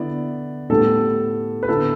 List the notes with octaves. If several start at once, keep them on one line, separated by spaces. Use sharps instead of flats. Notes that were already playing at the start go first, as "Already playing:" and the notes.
Already playing: D3 B3 E4 D5
A2 G3 B3 A4
B4
D3 B3 E4 A4